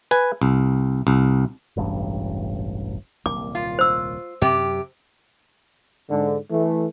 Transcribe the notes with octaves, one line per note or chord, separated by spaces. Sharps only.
B4 G#5
C2
C2
E1 A1 G2
D#1 C2 A#3 D6
F4
C5 E6
F#2 C3 G4
G#2 D3
E3 A3